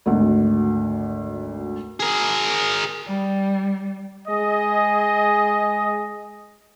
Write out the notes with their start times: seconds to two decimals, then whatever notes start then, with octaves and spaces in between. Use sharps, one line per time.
0.06 G#1 D2
1.99 G#4 A#4
3.05 G3
4.28 G#3 G#4 D#5